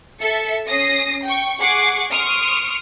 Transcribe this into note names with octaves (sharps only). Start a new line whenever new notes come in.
A4 E5 C#7
C#4 D#6 A#6 C7
G5 C#6
G#4 F#5 C#6 D6 C7
C6 C#6 D#6 F6 D7